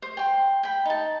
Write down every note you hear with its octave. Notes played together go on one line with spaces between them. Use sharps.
C5
G5 C6
G5 B5
D#4 A5